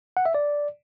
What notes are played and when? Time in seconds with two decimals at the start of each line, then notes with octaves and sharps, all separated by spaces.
0.17 F#5
0.26 E5
0.35 D5